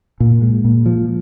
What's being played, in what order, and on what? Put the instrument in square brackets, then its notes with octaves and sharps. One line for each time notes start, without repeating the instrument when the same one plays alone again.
[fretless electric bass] A#2
G#3
A#2
F3